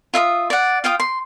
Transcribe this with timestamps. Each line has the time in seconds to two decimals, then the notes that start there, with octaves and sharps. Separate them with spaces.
0.14 F4 E5 F5 D#6
0.50 D5 F#5
0.84 F4 F5 G5 D#6
1.00 C6